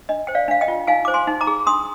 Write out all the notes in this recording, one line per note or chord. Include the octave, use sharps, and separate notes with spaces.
D4 D#5
C5 G5
D5 F5
D4 F5
D#5 G5
F4
D#4 F5 G#5
C5 D6
G#5 C6
D#4
A#5 D6
G#4
D4 C6 D#6